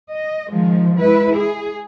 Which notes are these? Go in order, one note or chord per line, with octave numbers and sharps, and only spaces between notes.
D#5
D#3 F3 G#3
G#3 E4 B4
G#4